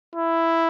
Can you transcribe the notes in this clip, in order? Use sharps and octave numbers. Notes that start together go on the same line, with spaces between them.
E4